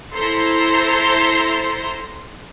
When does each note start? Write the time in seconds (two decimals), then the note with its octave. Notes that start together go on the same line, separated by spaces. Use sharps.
0.14 E4 A4 C5 A#5 C6